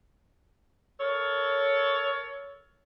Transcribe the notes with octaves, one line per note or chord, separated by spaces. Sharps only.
A4 A#4 C#5